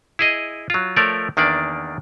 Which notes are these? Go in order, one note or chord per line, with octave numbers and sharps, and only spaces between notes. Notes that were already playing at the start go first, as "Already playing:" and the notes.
E4 G#4 D#5
F#3 F4
F3 A3 A#4 C#5 D5
E2 D#3 A#3 D4 D5